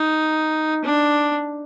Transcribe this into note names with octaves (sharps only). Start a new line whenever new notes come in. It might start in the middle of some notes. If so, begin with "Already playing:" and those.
Already playing: D#4
D4